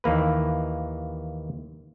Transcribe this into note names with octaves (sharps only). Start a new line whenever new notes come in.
D#2 E3 A#3 B4